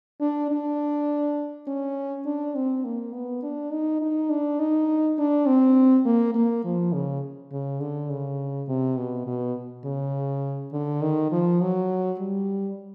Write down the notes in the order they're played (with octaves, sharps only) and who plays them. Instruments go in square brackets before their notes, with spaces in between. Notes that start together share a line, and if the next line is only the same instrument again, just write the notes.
[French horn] D4
D4
C#4
D4
C4
A#3
B3
D4
D#4
D#4
D4
D#4
D4
C4
A#3
A#3
F3
C#3
C#3
D3
C#3
C3
B2
B2
C#3
D3
D#3
F3
F#3
G3